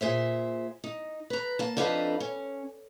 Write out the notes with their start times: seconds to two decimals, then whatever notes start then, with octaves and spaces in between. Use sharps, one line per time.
0.01 A#2 G#4 C5 E5
0.84 D#4
1.30 B4 A#5
1.59 A#3 A5
1.77 F2 D4 D#4 A4 B4 F5
2.20 C#4